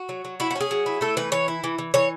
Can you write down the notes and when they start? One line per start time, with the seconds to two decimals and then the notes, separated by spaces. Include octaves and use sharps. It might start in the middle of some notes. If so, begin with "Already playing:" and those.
Already playing: F#4
0.09 F#3
0.25 F#3
0.40 E4 F#4
0.51 F#4
0.56 C#4
0.61 G#4
0.71 F#3
0.86 E4
1.01 A3 A4
1.17 E3 B4
1.32 E3 C#5
1.48 E4
1.64 E3
1.78 E3
1.94 E3 C#5